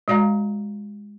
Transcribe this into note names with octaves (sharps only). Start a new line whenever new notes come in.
G#3 F#4 D5 F5 A#5